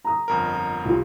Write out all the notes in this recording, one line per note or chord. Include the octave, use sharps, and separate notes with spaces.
A#5 D#6
G1 F2 A#4
C2 F4